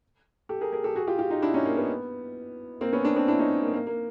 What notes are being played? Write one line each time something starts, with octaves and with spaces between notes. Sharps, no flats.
G4 A4
G#4 A#4
G#4 A#4
G4 A4
F#4 G#4
F4 G4
F4 G4
D#4 F4
D4 E4
C#4 D#4
A#3
B3
A#3 C4
B3 C#4
C4 D4
C4 D4
D4 E4
C#4 D#4
A#3
A#3
A#3